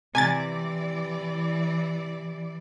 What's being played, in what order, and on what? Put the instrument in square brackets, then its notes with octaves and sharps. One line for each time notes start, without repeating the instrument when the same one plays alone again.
[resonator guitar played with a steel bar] C3 [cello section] E3 D5 [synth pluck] G#5 G#6 A6